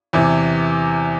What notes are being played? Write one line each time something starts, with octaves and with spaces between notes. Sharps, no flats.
E2 C3 E3